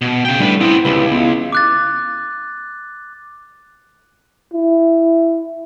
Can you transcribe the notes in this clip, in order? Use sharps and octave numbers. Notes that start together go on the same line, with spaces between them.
B2
C#3 G5
A2 G3 A3 D4 B4
B3 C4 E4
C#2 E4 G4 B4
B3 E4
D6 F#6 A6
E4